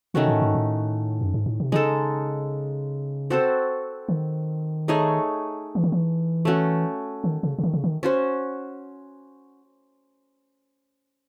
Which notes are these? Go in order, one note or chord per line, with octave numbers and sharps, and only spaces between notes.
C3 D#3 A3 C#4 F#4
A2
G#2
A2
F#2
G#2
A2
C3
C#3 G#3 D#4 A4
C4 F#4 A4 C5
D#3
A3 D#4 G#4 C#5
E3
D#3
E3
A3 C#4 F#4
D#3
C#3
C#3
D#3
C#3
D#3
C#4 F#4 C5